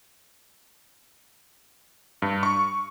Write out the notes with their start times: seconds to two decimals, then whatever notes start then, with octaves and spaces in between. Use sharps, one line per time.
2.22 G2
2.43 C#6